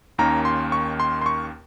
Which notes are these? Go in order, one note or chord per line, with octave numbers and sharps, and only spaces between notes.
D#2 D#3 A#3 C#4 A#5
C6
C#6
C6
C6
C#6